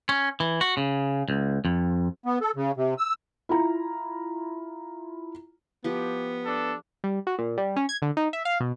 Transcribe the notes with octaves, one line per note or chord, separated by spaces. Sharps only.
C#4
E3
F#4
C#3
C#2
F2
B3
A4
C#3
C3
E6
E4 F4 A#5
F3 B3 G4
D4 A4
G3
F#4
A#2
G3
C#4
G#6
D3
D#4
E5
F5
B2